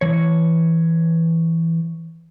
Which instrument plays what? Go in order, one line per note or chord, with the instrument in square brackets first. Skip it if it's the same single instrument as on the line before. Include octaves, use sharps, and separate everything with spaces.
[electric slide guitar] E3 C#5